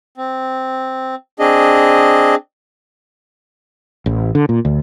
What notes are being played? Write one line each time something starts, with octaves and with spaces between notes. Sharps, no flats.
C4
C4 D4 G#4 D#5
A1
D3
A#2
D2